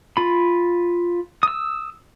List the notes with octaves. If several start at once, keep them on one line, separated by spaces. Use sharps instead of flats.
F4 B5
D#6 E6